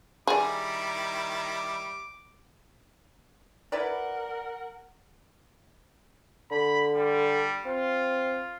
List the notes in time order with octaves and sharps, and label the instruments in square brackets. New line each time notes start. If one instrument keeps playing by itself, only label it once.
[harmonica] D#3 G3 E4 [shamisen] G#4 D5 [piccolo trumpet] D6
[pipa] E4 B4 D5 [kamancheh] A#4 F#5
[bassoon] D3 [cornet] B5
[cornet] G3
[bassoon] C4 [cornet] F4